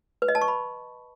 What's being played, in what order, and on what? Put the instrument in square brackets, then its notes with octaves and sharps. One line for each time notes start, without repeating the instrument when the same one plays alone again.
[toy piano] B4
D#5
A5
C#6
B5